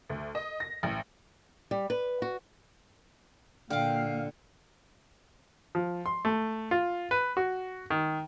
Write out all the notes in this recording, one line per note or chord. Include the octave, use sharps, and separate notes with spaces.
D2
D#5
A#6
A1
G3
B4
F#4
A#2 D3 F5 G5 D6 F6
F3
C6
A3
F4
B4
F#4
D#3